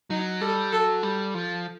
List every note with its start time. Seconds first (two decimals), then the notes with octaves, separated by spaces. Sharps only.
0.10 F#3 D#4
0.41 G3 A4
0.72 F#3 A4
1.03 G3
1.34 F3